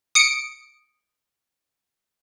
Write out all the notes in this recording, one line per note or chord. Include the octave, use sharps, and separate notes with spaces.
D#6 C#7 D7